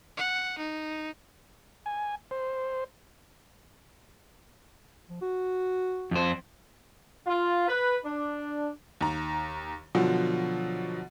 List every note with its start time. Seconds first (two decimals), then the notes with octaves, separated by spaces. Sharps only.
0.17 F#5
0.59 D#4
1.86 G#5
2.31 C5
5.09 F3
5.22 F#4
6.11 F2 C5
7.27 F4
7.68 B4
8.04 D4
9.01 D#2 A#5
9.95 B2 D3 F3 F#3